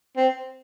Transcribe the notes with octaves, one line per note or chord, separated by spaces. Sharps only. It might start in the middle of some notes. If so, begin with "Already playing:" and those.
C4